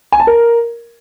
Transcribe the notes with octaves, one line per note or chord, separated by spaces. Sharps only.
G#5
A5
A#4